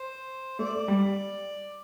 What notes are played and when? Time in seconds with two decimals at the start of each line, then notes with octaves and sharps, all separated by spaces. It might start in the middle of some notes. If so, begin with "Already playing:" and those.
Already playing: C5
0.59 A3 D5
0.88 G3